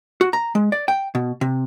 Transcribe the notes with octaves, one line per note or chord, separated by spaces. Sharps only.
F#4
A#5
G#3
D5
G5
B2
C3